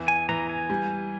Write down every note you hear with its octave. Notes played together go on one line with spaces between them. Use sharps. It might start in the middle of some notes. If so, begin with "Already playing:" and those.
Already playing: E2 E3
G#5
E3 A#5
G#5
G3